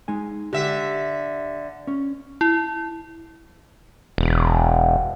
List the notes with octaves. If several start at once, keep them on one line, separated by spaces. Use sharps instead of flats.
G#3 D#4 G#5
D3 G4 E5
C#4
E4
E1